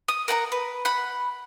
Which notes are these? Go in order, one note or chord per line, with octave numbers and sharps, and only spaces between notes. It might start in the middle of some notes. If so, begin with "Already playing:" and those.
D#6
A#4 F#5 A5 A#5
B4
F#5 B5